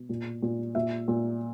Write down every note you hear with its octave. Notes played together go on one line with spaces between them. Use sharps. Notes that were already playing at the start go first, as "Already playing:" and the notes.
Already playing: B2
A#2
A#2
A#2 E5
A#2